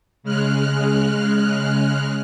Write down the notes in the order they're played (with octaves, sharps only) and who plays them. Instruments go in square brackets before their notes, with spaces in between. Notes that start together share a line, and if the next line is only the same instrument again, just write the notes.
[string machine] C#3 G#3 F6 F#6